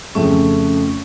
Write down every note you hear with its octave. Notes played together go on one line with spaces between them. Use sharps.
F2 C#3 A3 C#4